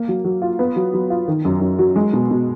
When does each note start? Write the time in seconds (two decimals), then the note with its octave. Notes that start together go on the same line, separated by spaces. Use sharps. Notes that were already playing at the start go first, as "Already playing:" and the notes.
Already playing: A#3
0.08 F#3
0.24 F#3
0.42 F4
0.59 B3
0.76 F#3
0.94 F#3
1.10 F4
1.28 D#3
1.45 F#2
1.61 F#2
1.79 F#3
1.96 G#3
2.13 B2
2.30 B2